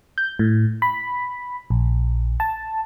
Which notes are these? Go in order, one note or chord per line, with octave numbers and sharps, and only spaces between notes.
G6
A2
B5
A#1
A5